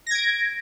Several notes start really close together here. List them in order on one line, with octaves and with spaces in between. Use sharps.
A#6 G#6 D7